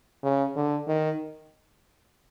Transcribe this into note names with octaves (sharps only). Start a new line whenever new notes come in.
C#3
D3
D#3